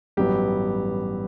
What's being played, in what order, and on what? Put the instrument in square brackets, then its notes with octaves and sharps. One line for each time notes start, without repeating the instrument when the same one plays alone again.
[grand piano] A1 G2 F#3 B3 G4